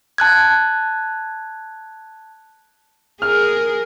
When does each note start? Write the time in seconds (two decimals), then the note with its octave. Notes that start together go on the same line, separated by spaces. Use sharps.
0.18 A5 F#6 G#6
3.22 G#4 A#4 F6